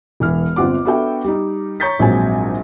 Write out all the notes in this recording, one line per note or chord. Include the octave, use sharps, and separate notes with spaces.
E1 E3 F6
G1 C4 F4 F#5 D6
B3 D4 F#4 A4 E5 G5
G3 D#4
C#5 A#5 C#6 G6 A6 B6
A#1 G#2 F#3 C4 G#5